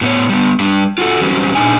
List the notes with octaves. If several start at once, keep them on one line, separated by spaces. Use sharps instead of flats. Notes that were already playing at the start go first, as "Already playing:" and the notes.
A2 B3 C#5
G3 B3
G3 D4
F4 F#4 G#4 A4
E3 F#3 G3 C4 C#4
A#2 D4 D#4 G#4 G#5